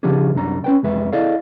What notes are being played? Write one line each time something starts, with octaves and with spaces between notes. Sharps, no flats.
C#3 F3 D4 F4 G4 G#4
C2 F#2 D4 A#5
C#4 B4 G5
C2 F2 G#3 B4 E5
E4 G#4 A4 D5 D#5 F5